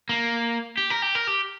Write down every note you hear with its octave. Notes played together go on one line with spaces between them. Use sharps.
A#3
G4
A#4
G4
A#4
G4